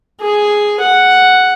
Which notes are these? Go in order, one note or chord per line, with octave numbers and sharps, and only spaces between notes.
G#4
F#5